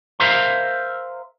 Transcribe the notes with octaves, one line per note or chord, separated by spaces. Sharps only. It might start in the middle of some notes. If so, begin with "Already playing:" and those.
A#4 C5 E5 F5 A#5 C6